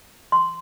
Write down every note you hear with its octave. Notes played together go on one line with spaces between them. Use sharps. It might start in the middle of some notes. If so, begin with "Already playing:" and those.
C6